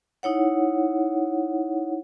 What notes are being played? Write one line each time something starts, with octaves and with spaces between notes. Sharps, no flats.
D#4 E4 C#5 F#5